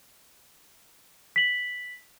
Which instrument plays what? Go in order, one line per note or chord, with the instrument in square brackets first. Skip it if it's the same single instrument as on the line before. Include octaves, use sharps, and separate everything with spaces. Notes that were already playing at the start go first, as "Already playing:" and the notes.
[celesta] B6 F#7